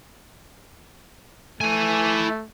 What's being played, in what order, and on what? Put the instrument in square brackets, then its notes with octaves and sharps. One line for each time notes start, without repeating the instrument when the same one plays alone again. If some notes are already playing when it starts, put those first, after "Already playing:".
[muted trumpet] A3 [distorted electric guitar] E4 G#5